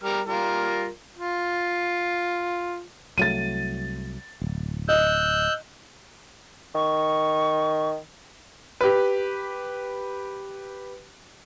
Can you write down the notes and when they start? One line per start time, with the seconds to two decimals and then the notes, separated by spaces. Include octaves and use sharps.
0.04 G3 A#4 F6
0.28 G3 F4 A#4
1.17 F4
3.18 C2 F#3 A3 A6 D#7
4.41 D1
4.89 D#5 E6 F#6 G6
6.75 D#3 C#6
8.81 G4 B4